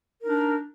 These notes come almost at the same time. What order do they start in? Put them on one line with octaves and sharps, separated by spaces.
A#4 D#4 D4